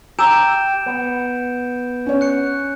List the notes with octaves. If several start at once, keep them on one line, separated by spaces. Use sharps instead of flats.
G4 A#5 E6 G6 D7 E7
B3
C#4 C#5
F#6 C#7